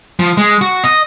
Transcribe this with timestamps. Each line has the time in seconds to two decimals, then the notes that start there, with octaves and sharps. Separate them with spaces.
0.19 F3
0.37 G#3
0.61 F#4
0.84 D#5